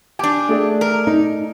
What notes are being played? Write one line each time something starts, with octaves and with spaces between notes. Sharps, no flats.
D4 G4 G#5
A3 G#4 D5
A#4
D#4